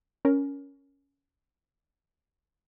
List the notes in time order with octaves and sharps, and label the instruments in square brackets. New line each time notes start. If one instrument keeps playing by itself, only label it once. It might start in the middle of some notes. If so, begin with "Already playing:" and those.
[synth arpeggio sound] C#4 A#4